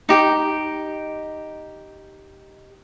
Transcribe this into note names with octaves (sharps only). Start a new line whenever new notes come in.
D#4 G4